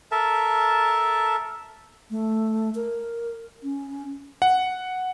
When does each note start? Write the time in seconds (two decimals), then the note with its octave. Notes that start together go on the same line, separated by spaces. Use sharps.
0.11 A4 A#4 E5 A5
2.10 A3
2.75 A#4
3.63 C#4
4.42 F#5